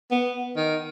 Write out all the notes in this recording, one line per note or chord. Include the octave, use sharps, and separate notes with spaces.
B3
D#3